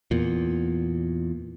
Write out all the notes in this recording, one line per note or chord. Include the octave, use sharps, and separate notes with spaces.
E2 A#2